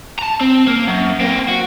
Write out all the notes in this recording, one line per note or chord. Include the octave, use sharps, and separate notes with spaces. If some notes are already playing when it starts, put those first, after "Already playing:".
A5 A#5
C4
A#3
F#2
A#3 C4
F#4